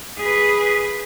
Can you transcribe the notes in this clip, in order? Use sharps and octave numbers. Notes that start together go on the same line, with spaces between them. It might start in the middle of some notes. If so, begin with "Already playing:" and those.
G#4 B4